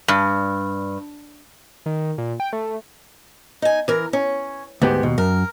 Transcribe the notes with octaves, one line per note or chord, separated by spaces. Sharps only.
G2
D#3
A#2
G5
A3
D#4 G#5
E3 A#4
C#4
D2 G#2 B3 G4
D#2 B2
F#2 A#4